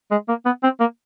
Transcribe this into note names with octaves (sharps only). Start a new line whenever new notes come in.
G#3
A#3
B3
C4
A#3